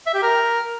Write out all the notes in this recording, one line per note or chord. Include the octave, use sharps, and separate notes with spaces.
E5
G4
A#4